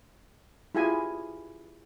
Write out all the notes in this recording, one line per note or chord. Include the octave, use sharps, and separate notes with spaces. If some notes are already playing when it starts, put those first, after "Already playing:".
E4 F4 G4 G#4 G#5